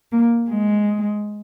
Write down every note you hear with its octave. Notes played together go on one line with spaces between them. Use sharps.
A#3
G#3